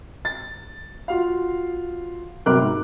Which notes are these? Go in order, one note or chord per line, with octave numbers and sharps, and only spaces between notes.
A6
F4 F#4 F5
G1 C3 F#3 A#4 D6 F#6
G#2